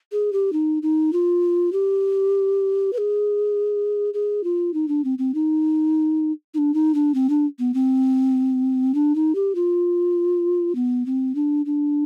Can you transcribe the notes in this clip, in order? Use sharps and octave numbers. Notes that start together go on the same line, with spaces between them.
G#4
G4
D#4
D#4
F4
G4
B4
G#4
G#4
F4
D#4
D4
C4
C4
D#4
D#4
D4
D#4
D4
C4
D4
B3
C4
D4
D#4
G4
F4
B3
C4
D4
D4